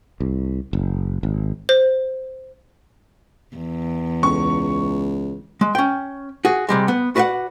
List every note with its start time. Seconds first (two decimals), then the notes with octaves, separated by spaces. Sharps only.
0.20 C2
0.73 F#1
1.23 G#1
1.69 C5
3.56 E2
4.23 C#2 C#6
5.61 G#3
5.75 C#4 G5
6.45 F#4 G#4
6.69 C3 G3 G#3
6.88 B3
7.16 F#4 B4 D5 E5 F#5